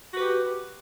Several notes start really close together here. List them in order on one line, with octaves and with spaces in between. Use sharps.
F#4 B4 G4